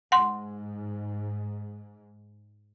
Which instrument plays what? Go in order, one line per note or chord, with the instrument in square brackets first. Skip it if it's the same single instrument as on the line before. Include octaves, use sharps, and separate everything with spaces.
[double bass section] G#2 [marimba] F#5 C6